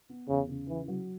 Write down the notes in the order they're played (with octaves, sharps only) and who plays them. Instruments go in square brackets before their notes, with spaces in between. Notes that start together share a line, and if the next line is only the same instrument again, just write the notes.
[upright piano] B3
[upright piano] E2 [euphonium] C#3
[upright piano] C#3
[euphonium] E3 [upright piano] E4
[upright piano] F#3